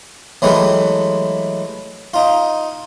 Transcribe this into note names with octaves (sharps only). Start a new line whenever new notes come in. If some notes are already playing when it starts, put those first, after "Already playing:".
E3 F#3 G#3 A3 G4 B4
D#4 F4